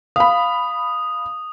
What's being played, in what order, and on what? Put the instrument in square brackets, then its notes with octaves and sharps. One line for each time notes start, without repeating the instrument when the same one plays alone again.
[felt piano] F5 B5 [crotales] D#6